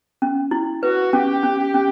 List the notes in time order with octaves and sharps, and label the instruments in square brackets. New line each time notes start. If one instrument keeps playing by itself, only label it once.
[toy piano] C#4
E4
[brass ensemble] F#4 [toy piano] B4
[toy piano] C#4 [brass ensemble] G4
[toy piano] C#4
[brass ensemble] G4
[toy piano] C#4